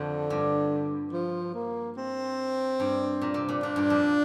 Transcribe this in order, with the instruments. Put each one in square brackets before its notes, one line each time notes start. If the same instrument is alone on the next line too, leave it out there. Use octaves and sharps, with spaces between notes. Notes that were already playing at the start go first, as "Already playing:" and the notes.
Already playing: [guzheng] F2 [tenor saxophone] D3
[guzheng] G2
[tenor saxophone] F3
A#3
C4
[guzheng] G2
A#2
C3
A#2
[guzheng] A#2 [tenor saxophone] D4
[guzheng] G2
F2